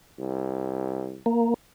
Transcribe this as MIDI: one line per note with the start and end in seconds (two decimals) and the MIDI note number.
0.19 1.18 36
1.26 1.54 58